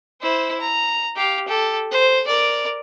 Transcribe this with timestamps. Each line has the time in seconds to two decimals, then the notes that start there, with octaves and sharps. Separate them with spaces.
0.21 E4 C5
0.61 A#5
1.16 G4 F5
1.48 G4 A4
1.92 C5
2.27 A#4 D5